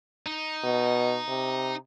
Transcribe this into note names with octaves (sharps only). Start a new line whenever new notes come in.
D#4
B2
C3